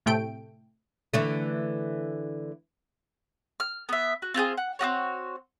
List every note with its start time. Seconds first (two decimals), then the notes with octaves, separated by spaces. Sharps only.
0.06 A2 C3 A3 G5 D7
1.14 D3 E3 A3
3.60 F6
3.89 B3 E5
4.22 F#4
4.34 C4 F4 G4 G#4
4.57 F#5
4.79 C4 D#4 F#4 C#5